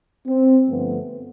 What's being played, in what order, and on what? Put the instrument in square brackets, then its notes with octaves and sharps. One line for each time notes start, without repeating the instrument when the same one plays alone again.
[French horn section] C4
G2 D3 F3 A3 B3